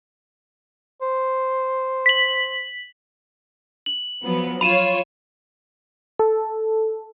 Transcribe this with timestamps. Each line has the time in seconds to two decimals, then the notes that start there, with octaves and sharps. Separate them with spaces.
1.02 C5
2.06 B6 F#7
3.86 F#7
4.23 F3 F#3 B3
4.61 F4 C#5 B5 D#7 E7
6.19 A4